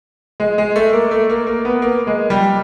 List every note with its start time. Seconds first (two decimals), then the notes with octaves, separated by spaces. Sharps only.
0.40 G#3
0.58 G#3
0.76 A3
0.93 A#3
1.11 A3
1.30 A#3
1.47 A#3
1.65 B3
1.82 A#3
2.07 G#3
2.30 G3